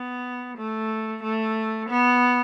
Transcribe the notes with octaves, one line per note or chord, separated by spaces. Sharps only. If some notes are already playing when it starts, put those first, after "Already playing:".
Already playing: B3
A3
A3
B3